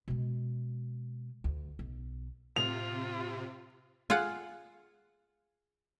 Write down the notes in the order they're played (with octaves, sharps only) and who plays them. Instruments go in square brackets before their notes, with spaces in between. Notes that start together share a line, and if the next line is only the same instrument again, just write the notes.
[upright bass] B2 G#3
D2
B1
[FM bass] A2 [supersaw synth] C3 [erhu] F4 [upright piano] F7
[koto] F4 G#4 F5 F#5